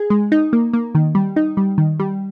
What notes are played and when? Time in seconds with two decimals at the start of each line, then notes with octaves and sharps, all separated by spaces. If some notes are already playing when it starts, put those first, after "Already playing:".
Already playing: G#4
0.10 G#3
0.32 D#4
0.53 A#3
0.73 A#3
0.95 D#3
1.15 G3
1.36 D#4
1.57 G3
1.78 D#3
2.00 G3